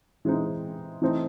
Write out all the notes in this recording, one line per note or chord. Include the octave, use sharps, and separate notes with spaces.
E3 G#3 C4 D#4
E3 A3 C4 D#4